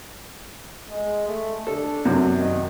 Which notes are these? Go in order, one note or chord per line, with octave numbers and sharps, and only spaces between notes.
G#3
A3
D4 A4
F#2 C3
D#3